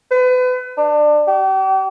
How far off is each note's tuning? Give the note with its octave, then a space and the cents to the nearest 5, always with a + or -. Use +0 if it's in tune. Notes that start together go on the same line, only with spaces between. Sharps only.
B4 +35
D4 +25
G4 -40